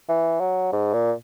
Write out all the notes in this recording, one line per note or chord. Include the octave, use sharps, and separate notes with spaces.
E3
F#3
G#2
A#2